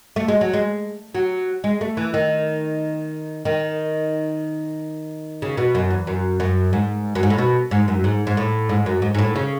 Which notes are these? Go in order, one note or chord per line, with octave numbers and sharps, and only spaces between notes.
A3
G#3
F#3
G#3
F#3
G#3
A3
E3
D#3
D#3
C#3
B2
F#2
E2
F#2
F#2
G#2
F#2
G#2
A2
B2
G#2
F#2
G#2
G#2
A2
G#2
F#2
G#2
G#2
A2
C#3